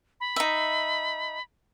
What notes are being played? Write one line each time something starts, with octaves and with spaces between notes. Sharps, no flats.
B5
D#4 E5